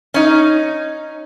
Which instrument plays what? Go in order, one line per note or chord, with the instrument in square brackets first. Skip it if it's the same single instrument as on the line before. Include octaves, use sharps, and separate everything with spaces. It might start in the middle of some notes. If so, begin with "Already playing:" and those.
[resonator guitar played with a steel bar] C#4 D#4